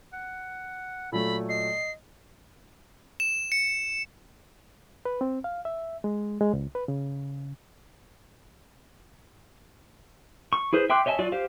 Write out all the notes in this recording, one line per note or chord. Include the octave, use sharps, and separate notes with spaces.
F#5
A#2 F#3 A3 A4 B5
D#5 C7
E7
C#7
B4
C4
F5
E5
G#3
G#3
C#2
B4
C#3
C#6
E4 G#4 B4 C5
E5 G5 C6 D6 F#6
C#5 D#5 E5 G#5 A5
F#3 F4 D5
G4 C5 F5